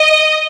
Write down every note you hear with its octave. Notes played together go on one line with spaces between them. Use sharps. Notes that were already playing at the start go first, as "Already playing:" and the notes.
Already playing: D#5